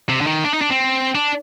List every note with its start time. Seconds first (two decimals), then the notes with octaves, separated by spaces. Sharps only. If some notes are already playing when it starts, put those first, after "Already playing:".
0.09 C3
0.21 D3
0.27 D#3
0.45 D4
0.53 D#4
0.61 D4
0.70 C4
1.15 D4